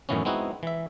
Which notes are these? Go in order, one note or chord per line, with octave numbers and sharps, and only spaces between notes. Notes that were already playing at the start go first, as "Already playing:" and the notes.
F#2 A2 D#3 E3 B3 C#4
G#3 B3 C4 D#4 E4 F#4
E3 E5